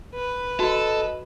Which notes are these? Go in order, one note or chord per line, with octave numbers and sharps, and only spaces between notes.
B4
F#4 A4 D#5